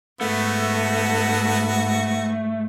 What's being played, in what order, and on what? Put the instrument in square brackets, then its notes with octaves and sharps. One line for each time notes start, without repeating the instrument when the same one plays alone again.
[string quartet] G#2 [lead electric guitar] A3 [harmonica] B3 F#4